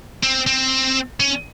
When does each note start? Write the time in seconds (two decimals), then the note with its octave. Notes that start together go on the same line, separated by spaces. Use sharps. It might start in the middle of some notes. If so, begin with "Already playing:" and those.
0.23 C4
0.47 C4
1.20 C#4